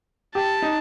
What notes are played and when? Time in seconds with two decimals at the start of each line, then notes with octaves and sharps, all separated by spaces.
0.35 G4 A5
0.62 D#4